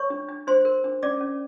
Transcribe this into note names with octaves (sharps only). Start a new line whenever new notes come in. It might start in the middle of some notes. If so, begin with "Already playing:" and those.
Already playing: C#5 C#6
D4
D4
D4 C5 C6
A#4
D4
C#4 D5 D6
C#4